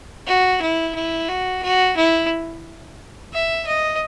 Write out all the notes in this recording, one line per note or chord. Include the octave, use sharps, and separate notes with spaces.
F#4
E4
E4
F#4
F#4
E4
E5
D#5